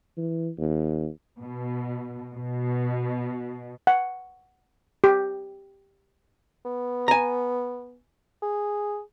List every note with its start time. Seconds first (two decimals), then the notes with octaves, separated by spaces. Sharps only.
0.17 E3
0.58 D#2
1.39 B2
2.33 B2
3.87 F#5
5.04 G4
6.65 B3
7.08 G#5 A#5
8.42 G#4